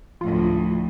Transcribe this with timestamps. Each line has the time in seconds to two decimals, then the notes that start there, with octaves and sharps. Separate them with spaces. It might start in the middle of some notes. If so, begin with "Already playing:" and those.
0.21 D2 A2 F3 A3 F4